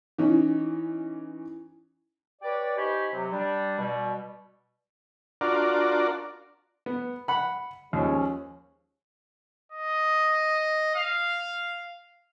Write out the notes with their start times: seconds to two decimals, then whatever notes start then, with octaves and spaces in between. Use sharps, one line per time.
0.18 E3 C#4 D#4
2.42 G4 B4 C#5 D5
2.76 D#4 G4 C5 G#5 B5 C#6
3.12 C3 F#3
3.32 G3 D4
3.78 B2 G3
5.41 D4 F4 F#4 A#4 D5
6.86 B3
7.28 F#5 B5
7.93 D#2 F3 G#3 C#4
9.72 D#5
10.96 F5